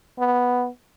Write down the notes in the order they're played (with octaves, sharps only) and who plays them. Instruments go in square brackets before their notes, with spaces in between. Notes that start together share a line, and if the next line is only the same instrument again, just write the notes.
[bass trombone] B3